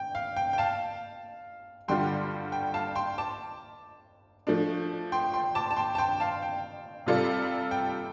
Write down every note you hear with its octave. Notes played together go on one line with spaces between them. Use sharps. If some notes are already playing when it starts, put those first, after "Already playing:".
Already playing: G5
F5
G5
G5
F5 A5
G2 D3 G3 F4 G5 C6
G5
F5 A5
G5 C6
A5 D6
F3 A3 D4
G5 C6
G5 C6
A5 D6
A5
G5 C6
A5
G5 C6
F5 A5
G5
C3 G3 F4 A4 D5
G5